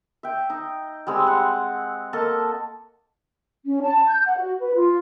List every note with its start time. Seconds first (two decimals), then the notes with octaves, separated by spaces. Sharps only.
0.23 E5 G5
0.50 D#4
1.07 G3 G#3 C4 E6
1.24 F#5 G#5
2.13 A#3 A4 D#5 A5
3.66 C#4
3.82 A5
4.07 G6
4.25 F#5
4.37 F#4
4.60 B4
4.75 F4